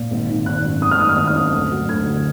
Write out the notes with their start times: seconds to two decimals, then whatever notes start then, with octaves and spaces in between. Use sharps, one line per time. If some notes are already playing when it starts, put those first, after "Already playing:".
Already playing: A#2
0.11 G#1
0.29 D#3
0.46 G#1 F#6
0.65 F#2
0.82 G#1 D#6
0.91 F6
1.00 D#3 D#6
1.09 F6
1.18 G#1 D#6
1.27 F6
1.36 F#2 D#6
1.53 D2
1.71 F#3
1.89 D2 G#6
2.07 D3